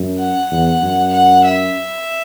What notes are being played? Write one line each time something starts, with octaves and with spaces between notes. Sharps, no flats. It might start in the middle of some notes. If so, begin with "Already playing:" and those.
Already playing: F#2
F#5
E2
F#2
F#5
E5